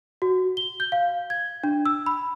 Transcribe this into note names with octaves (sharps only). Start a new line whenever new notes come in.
F#4
G7
G6
F5
G#6
D4
E6
B5